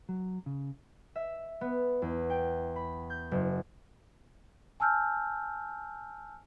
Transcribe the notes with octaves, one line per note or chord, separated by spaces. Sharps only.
F#3
C#3
E5
B3
E2
G5
B5
G6
F#1
G#5 A5 E6 F6 G6